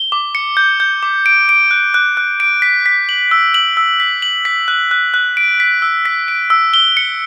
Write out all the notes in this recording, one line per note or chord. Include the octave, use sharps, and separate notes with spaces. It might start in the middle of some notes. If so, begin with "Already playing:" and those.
Already playing: G7
D6
C#7
G6
G6
D6
D7
D7
F#6
F#6
F#6
D7
B6
B6
F#7
E6
F#7
E6
B6
F#7
B6
F#6
F#6
F#6
D7
B6
E6
B6
D7
E6
G7
C#7